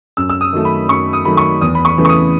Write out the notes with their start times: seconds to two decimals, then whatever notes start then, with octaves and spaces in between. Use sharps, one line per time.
0.17 F#2 E6
0.30 E6
0.41 D#6
0.53 D#3 F#3 A3
0.65 B5
0.89 F#2 C#6
1.13 D#6
1.25 D#3 F#3 A3 B5
1.37 C#6
1.61 E2 D#6
1.75 B5
1.85 C#6
1.97 C#3 E3 A3
2.05 C#6
2.09 D#6